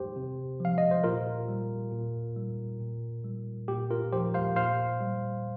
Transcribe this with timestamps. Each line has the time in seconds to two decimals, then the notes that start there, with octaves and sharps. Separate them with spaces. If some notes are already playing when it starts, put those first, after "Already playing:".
Already playing: G4 C5
0.16 C3
0.60 F3 F5
0.78 D#5
0.91 C5
1.04 A#2 F4 A#4
1.48 G3
1.92 A#2
2.36 G3
2.80 A#2
3.24 G3
3.68 A#2 G4
3.90 F4 A#4
4.13 F3 G4 C5
4.34 C5 F5
4.56 A#2 C5 F5
5.01 G3